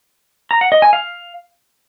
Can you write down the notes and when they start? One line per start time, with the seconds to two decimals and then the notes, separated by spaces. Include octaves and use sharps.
0.51 A#5
0.61 F#5
0.72 D#5
0.82 G#5
0.93 F5